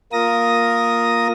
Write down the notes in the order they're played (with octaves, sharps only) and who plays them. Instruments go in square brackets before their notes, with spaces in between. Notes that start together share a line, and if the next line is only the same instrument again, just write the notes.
[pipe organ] A#3 F4 A#4 D#6 A#6